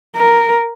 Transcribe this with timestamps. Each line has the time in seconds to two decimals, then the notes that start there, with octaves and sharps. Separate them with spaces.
0.17 A#4